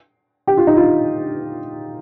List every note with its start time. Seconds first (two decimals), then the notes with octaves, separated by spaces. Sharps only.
0.47 G4
0.57 F4
0.67 D#4
0.77 F4